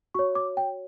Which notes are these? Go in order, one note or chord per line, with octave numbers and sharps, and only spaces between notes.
F#4 C#5 C#6
D6
G5